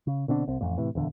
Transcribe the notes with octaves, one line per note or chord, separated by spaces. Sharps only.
C#3
B2 D3 C4 D4
C2 C4
A1 F2 A#2
A2 C3 E3
D#1 E2 D3